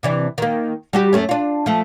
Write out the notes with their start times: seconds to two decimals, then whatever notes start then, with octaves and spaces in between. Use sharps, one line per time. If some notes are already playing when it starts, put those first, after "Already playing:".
0.03 C3 E3 D4
0.38 D#3 A#3
0.93 G3 F#4 G4
1.13 F#2 A3 C#4
1.29 D4 F4
1.66 F3 A3